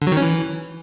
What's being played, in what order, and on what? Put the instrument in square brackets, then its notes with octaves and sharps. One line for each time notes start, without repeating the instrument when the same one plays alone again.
[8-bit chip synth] D3
F#3
D#3
C#4
E3